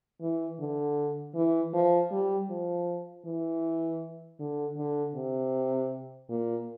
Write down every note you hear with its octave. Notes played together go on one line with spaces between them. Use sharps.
E3
D3
E3
F3
G3
F3
E3
D3
D3
C3
A#2